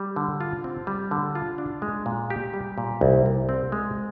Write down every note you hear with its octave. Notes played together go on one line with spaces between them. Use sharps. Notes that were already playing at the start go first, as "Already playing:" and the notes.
Already playing: G3
D3
F4
C4
G3
D3
F4
D4
G#3
A#2
G4
G3
A#2
C2
C2
C4
G#3